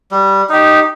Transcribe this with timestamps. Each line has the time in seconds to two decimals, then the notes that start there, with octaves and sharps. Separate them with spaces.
0.11 G3
0.49 D#4 G4